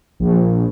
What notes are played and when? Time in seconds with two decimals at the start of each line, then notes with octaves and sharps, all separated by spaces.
0.20 A#1